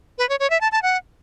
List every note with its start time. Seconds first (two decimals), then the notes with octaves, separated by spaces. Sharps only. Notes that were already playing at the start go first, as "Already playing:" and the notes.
0.18 B4
0.29 C#5
0.40 C#5
0.50 E5
0.61 A5
0.72 A5
0.83 F#5